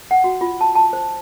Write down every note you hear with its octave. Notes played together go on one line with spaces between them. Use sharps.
F#5
F#4
F4
A5
A5
C5